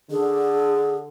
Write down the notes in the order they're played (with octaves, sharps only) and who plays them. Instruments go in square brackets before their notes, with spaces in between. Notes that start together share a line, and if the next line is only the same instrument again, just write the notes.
[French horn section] D3 [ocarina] G#4